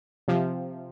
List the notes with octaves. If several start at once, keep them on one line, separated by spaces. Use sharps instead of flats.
C3 F3